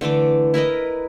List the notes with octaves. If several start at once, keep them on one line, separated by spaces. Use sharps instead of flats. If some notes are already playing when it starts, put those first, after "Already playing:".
D3 E3 A3 D6
E4 A#4 B4 D#5